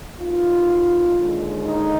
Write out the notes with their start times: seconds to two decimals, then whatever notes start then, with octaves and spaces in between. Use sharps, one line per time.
0.19 B2 A#3 D#4 F4
1.17 D#2 D3 G#3
1.66 D#4